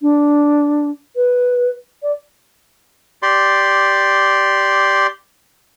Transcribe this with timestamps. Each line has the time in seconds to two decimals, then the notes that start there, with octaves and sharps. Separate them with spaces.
0.02 D4
1.16 B4
2.03 D5
3.23 G4 D5 C6